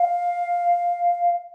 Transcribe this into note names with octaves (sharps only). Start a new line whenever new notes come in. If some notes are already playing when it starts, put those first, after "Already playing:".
Already playing: F5